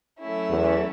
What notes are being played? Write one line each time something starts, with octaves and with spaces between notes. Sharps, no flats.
F#3 A3 C#4 E4
E2